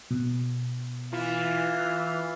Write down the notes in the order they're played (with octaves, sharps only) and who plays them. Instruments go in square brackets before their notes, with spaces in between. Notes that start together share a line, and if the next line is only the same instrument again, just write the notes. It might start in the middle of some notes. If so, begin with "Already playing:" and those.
[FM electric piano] B2
[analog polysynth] E3 E5 [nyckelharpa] F4